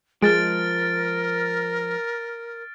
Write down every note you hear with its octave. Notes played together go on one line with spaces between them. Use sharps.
F3 G#3 A#4 F6 A6 D7